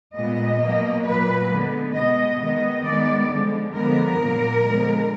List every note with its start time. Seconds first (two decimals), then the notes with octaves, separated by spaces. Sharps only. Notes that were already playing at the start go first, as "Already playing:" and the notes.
0.15 A#2 G#3 B3 D#5
0.60 B2 F#3 A#3
1.05 A#2 F#3 A#3 B4
1.50 D3 G#3 B3
1.95 B2 G#3 B3 D#5
2.40 D#3 G#3 B3 D#5
2.85 D#3 G#3 B3 D5
3.30 D3 F3 G#3
3.74 D3 F3 G#3 B3 A#4
4.19 A#2 F#3 A#3
4.64 D3 F3 G#3 B3